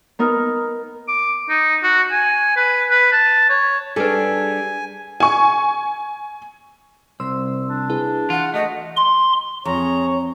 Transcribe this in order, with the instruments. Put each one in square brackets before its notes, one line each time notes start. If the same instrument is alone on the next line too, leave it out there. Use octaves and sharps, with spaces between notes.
[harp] B3 D#4 A#4 [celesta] A#5 D#6 F6
[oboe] D6
D#4
F#4
G#5
B4
B4
A5
C#5
[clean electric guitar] G3 D4 [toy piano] G#4 B4 [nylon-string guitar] A4 [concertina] G#5
[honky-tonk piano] G#5 C#6
[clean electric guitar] C2 [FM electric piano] C5 C6 E6
[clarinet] D4
[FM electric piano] E4 G#4 B4
[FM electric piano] E3 [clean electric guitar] F4 [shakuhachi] F#5
[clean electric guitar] A3 [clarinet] F#4 [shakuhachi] D#5
[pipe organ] C6
[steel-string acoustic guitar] F2 [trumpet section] G#4 C#6 [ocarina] C#5 [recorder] A#5